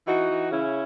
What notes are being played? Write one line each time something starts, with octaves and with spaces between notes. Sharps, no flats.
E3 D#4 F#4
E3
C#3 C#4 E4